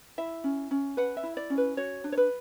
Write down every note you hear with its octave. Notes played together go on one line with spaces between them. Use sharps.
E4 E5
C#4
C#4
B4 F#5
E5
E4
D5
C#4
B4
F#4 C#5
D4
C#5
B4